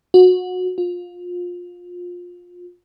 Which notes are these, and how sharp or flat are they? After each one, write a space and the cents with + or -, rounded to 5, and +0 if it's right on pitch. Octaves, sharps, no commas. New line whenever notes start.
F#4 -20
F4 +25